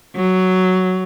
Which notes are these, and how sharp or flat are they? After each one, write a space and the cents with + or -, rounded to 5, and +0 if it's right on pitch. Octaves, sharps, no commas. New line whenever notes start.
F#3 +5